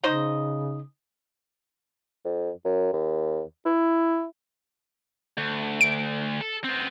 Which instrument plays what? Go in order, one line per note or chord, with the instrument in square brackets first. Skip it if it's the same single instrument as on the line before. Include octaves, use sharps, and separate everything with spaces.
[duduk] C#3 [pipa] D#4 C5 D#5
[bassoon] F2
F#2
D#2
E4
[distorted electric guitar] D2
[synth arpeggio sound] D7
[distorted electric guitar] A4
B3 C4